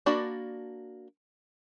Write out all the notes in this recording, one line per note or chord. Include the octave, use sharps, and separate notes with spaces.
A#3 D4 F#4 D5 B5